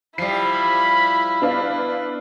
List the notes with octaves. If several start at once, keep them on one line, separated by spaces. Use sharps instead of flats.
F3 G3 E4 B5 C7
B3 D4 F5